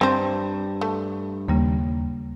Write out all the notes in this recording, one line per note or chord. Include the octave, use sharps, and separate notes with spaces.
G2 C4 C5
A3
D#2 C#3 G3 A#3